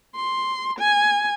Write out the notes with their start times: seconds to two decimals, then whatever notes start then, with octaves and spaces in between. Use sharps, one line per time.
0.16 C6
0.79 G#5